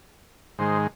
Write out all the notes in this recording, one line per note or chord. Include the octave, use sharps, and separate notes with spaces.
G#2 D#3 G#3 C5